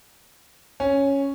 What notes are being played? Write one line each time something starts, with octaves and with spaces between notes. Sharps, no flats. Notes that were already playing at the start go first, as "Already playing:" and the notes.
C#4